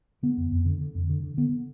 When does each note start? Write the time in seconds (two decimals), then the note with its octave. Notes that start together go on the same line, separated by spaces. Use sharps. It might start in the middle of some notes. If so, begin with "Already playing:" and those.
0.23 D3 B3
0.37 F2
0.52 F2
0.66 D3
0.81 D3
0.95 F2
1.09 D3
1.24 D3
1.37 D3 B3
1.52 D3